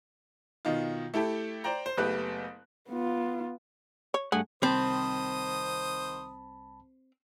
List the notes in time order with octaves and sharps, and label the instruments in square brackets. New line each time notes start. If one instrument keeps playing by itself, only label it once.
[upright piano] B2 D#3 D#4 F4
A3 E4 G4 A4
C5 D5 G5 A#5
C5
F#1 A3 B3 G4 B4 F#6
[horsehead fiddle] B3 F4
[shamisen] C#5
[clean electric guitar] G2 A3 F#5 [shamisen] G#4
[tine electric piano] C2 A5 B5 [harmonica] D#3 C5 D#6 [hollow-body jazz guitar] C4